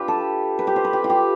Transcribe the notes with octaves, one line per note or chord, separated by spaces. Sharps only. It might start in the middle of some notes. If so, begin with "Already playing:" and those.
Already playing: D4 F4 G4 B4
A4
B4
G4
C5
B4
G4
F4
G4